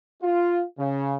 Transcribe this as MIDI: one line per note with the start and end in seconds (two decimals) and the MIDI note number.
0.22 0.62 65
0.78 1.16 49